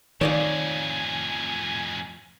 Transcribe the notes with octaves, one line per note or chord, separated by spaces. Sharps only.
F2 A2 D#3 C#5 D5 F5 G#5